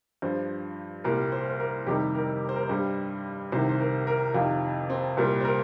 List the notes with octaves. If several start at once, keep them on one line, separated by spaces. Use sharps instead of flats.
G2 F3 C5
C2 A#2 G3 A#4
C5
C5
A#4
F2 C3 D#3 G3 G4
A#4
C5
A#4
C5
G2 G3
C2 C3 D#3 C5
C5
A#4
A#4
F2 C3 D#3 F4
C4
C2 A#2 G3
C5
A#4